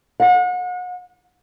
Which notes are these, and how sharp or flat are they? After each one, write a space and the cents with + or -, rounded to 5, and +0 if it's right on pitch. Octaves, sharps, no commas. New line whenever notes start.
F#5 -35